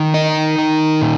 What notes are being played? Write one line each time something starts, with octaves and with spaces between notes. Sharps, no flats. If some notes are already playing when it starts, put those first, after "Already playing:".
Already playing: D#3
D#4
D#3
A#2